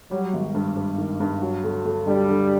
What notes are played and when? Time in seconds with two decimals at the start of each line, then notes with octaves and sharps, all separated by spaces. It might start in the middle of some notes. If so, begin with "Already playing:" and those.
0.11 F#3 G3
0.33 G#1
0.55 G2
0.76 G2
0.98 D#3
1.20 G2
1.42 F#3
1.64 D2
1.85 D2
2.06 D3 G3
2.29 D3